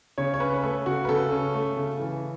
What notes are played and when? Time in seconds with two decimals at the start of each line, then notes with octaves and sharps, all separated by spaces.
0.18 C#3 C#5
0.34 C#5
0.40 C#4 B4
0.54 B4
0.63 A3 A4
0.86 C#3 F#4
1.05 B4
1.09 C#3 A4
1.31 C#4
1.54 A3
1.77 C#3
2.00 E3